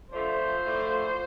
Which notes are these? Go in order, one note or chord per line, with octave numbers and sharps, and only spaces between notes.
D3 F3 A3 D4 F4 C5
A2 F3 A3 D4 F4